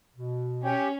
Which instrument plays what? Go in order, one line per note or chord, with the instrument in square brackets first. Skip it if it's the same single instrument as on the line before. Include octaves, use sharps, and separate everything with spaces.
[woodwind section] B2
[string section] C#4 [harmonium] G4